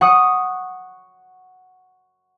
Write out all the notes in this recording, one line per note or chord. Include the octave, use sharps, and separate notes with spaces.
F#5 C#6 D#6